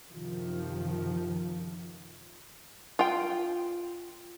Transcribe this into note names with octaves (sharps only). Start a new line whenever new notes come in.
F#2 C3 D#3 F3
F4 G5